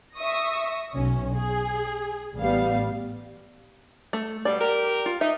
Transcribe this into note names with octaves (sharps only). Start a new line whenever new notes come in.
E5 C#6 D#6 A#6
B1 C#4
G#4
A1 G3 B3 F5
A3
B2 G3 D5
G4 A#4
F4
D#4 E5